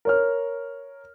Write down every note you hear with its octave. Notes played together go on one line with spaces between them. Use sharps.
A#4 C#5 F6